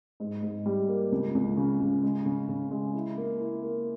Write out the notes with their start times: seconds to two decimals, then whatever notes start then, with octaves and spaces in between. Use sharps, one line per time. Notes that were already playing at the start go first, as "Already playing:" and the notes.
0.20 G#2
0.42 G#2
0.66 G3
0.88 A#3
1.12 C#2
1.35 C#2
1.57 C#3
1.81 C#3
2.03 G#3
2.25 C#3
2.49 C#3
2.71 G#3
2.94 E4
3.17 A#3
3.40 E4
3.63 A#3